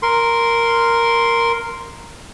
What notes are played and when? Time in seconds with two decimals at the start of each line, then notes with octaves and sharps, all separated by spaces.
0.02 A#4 C6